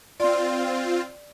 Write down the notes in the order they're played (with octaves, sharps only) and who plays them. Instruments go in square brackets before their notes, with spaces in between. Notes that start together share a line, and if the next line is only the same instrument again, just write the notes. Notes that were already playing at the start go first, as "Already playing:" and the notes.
[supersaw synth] C4 F4 [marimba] D5 C6